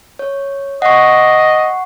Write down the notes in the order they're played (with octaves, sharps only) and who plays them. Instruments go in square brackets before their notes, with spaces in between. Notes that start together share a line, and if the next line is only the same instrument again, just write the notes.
[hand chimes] C#5
[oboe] D#5 [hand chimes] F#5 C#6